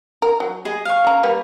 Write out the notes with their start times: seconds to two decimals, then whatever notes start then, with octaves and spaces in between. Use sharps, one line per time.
0.22 A#4
0.40 F#3
0.65 G#4 D#5
0.85 F5 C#6
1.05 C#3 A#5
1.23 G3 A#3 B4